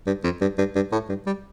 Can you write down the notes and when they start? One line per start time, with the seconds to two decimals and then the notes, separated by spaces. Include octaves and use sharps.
0.07 G2
0.24 F2
0.41 G2
0.58 G2
0.75 G2
0.92 A2
1.09 G2
1.26 G3